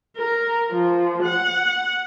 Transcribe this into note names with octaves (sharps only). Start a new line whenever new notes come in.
A#4
F3
F#5